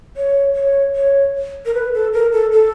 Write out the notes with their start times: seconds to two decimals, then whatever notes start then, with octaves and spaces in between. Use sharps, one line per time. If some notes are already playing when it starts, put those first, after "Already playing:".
0.17 C#5
0.55 C#5
0.95 C#5
1.66 A#4
1.74 B4
1.94 A4
2.13 A#4
2.32 A4
2.52 A4